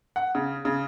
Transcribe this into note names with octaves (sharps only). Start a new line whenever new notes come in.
F#5
C#3
C#3